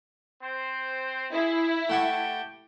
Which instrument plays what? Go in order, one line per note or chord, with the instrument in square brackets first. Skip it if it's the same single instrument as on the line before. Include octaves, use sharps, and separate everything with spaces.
[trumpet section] C4 C5
[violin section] E4 [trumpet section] G#4
[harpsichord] A3 F#5 C#6 [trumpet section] G4 G5 A5